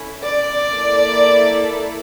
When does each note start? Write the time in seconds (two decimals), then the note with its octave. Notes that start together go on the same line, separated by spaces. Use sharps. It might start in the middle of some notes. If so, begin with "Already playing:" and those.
Already playing: C#4 E4 A4
0.24 D5
0.72 A#3 E4 A4